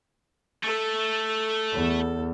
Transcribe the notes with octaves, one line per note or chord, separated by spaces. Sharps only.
A3 A4
E2